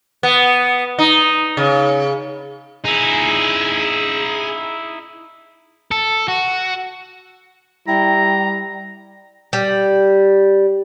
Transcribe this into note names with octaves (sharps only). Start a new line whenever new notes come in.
B3
D#4
C#3
D#4 E4 G#4
A4
F#4
G3 E4 G5 A#5
G3